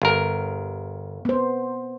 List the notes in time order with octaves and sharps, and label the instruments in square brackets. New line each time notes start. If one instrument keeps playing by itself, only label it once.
[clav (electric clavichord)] G1 A#4
[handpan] B3 C5